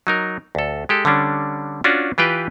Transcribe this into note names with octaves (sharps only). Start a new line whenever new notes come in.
F#3 D#4 A#4
D2 A4
G#3 G4 A4
D3 G3 C#4 D4
C#4 D4 F4 F#4
E3 F4 G4 B4 G5